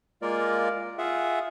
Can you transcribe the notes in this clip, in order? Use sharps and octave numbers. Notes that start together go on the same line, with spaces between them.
G#3 A#3 F4 A#4 D5
F4 G#4 E5 F#5